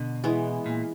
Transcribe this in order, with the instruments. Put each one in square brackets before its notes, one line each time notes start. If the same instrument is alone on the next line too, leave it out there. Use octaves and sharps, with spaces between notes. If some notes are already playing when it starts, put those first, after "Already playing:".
Already playing: [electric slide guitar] B2 [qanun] D3
[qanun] E3 G#3 B3
[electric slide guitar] A#2